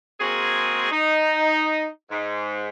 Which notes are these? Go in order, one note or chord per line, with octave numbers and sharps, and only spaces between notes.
G#3 A#3 C4 F#4 G#4
D#4
G#2